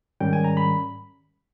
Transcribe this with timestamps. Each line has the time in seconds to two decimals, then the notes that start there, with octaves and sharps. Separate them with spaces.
0.20 G#2 D#3 G3 C#4 G5
0.33 G#5
0.44 A#5
0.57 B5